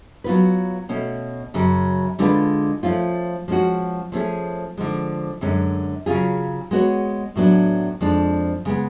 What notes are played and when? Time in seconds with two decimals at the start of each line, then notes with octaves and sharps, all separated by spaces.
0.24 F#3 B3 F4 B4
0.89 B2 A3 C#4
1.54 F#2 C#3 F#3
2.19 D3 G#3 D4 F4 B4
2.83 F3 A3 C#4 F4
3.48 F3 G#3 C#4 F#4
4.12 F3 A3 C#4 G#4
4.78 D3 F3 G#3
5.41 F#2 D3 G#3 C#4
6.06 C#3 F#3 C#4 F4 G#4
6.71 G#3 B3 F#4 C#5
7.36 A2 F#3 B3 D4
8.01 F2 F3 G#3 D4
8.65 C#3 G#3 B3